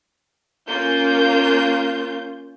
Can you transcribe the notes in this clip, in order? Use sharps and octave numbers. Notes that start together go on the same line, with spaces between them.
A#3 C#4 F4 G6